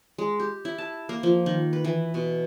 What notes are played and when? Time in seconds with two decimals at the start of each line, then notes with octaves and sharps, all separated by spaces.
0.18 G#3
0.40 G4
0.65 E4
0.78 A5
1.09 A#3
1.23 F3
1.46 D#3
1.73 B4
1.84 E3
2.14 B2